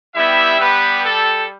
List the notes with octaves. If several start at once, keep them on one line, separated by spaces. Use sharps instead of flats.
G3 B3 E4 G4 E5
B3 B4
A4